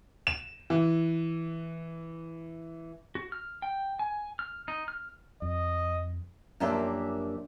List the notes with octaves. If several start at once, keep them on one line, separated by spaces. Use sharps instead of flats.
E7
E3
F#4
F6
G5
G#5
F6
D#4
F6
F2 D#5
F#2 F3 A#3 D4 G4 E5